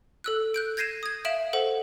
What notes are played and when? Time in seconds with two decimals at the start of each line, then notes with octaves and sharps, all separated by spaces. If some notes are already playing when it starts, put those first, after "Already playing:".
0.24 A4 E6 F#6
0.54 F#6 G6 D7
0.77 G6 G#6 A#6 C7 D#7 E7
1.03 D#6 G#6
1.25 E5 F5 D7 E7 F#7
1.53 A4 C5 F#5